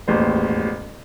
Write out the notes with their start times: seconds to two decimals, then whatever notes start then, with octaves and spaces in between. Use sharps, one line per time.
0.08 E1 A1 D#2 C5